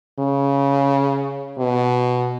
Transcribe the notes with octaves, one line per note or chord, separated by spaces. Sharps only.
C#3
B2